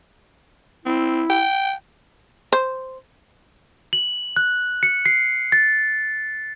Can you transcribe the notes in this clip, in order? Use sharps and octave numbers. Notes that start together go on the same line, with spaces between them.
C4 E4
G5
C5
F#7
F#6
C#7
C7
A6